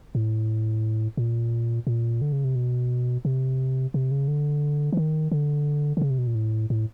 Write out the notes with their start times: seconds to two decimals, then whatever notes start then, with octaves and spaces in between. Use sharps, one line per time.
0.15 A2
1.17 A#2
1.87 A#2
2.21 D3
2.32 C#3
2.44 C3
2.55 B2
3.25 C3
3.94 C3
4.11 C#3
4.28 D3
4.93 E3
4.97 D#3
5.32 D3
5.97 D3
6.02 C#3
6.10 C3
6.18 B2
6.27 A#2
6.35 A2
6.70 A2